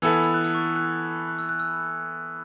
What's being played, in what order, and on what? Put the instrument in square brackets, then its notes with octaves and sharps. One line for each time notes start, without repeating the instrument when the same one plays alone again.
[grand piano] E3 B3 E4 A4 [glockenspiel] E6
[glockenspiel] E6
E6
F#6
E6
C#6
E6
F#6
F#6
E6
F#6
E6